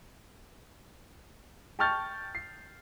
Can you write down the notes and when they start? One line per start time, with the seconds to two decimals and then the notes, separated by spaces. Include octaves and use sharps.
1.79 G5 A5 C#6 F6 G6 A6
2.35 C7